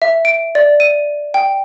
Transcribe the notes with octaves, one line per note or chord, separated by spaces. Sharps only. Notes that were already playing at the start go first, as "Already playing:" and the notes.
E5
D7
D5
D#7
G5